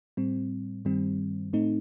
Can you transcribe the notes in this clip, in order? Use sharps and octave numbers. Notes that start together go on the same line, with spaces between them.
A2 G3 C4
G2 D#3 G3 C4
A2 A3 C4 D#4